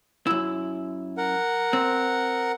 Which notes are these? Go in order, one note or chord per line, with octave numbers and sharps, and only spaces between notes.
F#2 E4
A#4 F#5
C4